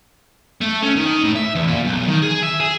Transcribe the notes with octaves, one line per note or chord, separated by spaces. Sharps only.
A3
C#4
D#3
A2
E5
E2
A#2
B1
D#3
G#4
E5
G#4